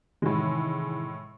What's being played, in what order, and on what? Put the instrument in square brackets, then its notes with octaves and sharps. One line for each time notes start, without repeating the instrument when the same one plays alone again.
[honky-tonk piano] A2 G#3 [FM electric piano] C3 D#3 E3